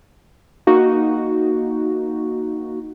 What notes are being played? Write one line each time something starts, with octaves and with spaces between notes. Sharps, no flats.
A#3 D#4 F#4